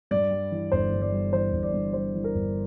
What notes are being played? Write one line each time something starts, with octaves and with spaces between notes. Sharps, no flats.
G2 D5
G3
E3
G1 C5
G2
D5
G3
E3 C5
G1
D5
G2
G3 C5
E3
A#4
G1